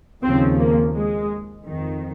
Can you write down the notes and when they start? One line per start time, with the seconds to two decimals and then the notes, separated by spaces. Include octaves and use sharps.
0.22 D#2 C#3 F3 C4
0.59 A#3
0.94 G#3
1.65 F2 D#3